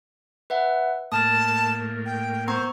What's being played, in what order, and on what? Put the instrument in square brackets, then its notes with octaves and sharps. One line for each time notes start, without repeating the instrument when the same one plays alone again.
[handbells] B4 E5 F#5
[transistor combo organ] A2 A#3 [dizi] A5 [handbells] D#6 F6 A6
[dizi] G5
[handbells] B3 A#5 C#6 [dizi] C5